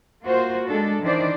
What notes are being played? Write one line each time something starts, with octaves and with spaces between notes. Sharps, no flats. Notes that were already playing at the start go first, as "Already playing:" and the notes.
A#3 F4 F#4 C5
G#3 D4 A4
D#3 E3 D4 C5 D5